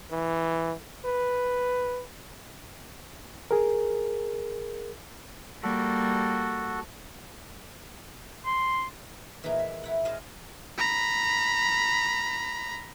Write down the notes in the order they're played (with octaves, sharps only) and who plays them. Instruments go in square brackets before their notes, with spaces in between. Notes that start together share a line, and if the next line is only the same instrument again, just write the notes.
[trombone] E3
B4
[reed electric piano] G#4 A#4
[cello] G3 A#3 [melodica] F#4 A4
[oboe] C6
[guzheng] A#2 E3 A#3 D#4 G#4
E5
E4 F#5
G#4 C5 D#5 F5 A5
[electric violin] A#5 B5